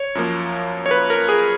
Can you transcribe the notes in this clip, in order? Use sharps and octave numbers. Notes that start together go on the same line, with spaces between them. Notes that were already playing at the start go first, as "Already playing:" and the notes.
Already playing: C#5
F#2 F3 A#3
C#5
B4
A#4
G#4